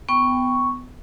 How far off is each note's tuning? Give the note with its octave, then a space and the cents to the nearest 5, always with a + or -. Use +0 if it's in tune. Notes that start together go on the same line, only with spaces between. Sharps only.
B3 +25 G5 +5 C#6 +0